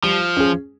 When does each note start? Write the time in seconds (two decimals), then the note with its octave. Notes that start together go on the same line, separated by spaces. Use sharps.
0.03 F3 G3
0.37 C#4 G#4